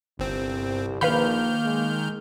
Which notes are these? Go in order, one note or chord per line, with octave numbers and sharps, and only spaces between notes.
G1 C2 C4
A#1 D#3 A#3 B4 F5 B5 F6 G6
G#3